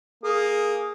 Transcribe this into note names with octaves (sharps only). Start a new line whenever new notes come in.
A#3 G#4 D#6